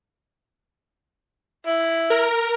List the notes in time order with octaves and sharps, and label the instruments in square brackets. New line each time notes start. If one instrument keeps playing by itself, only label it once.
[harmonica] E4
[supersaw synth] A#4